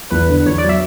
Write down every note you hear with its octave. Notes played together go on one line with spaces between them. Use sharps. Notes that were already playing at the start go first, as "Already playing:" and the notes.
E2 B4
D3
E2 C#5
D5
F#3
E5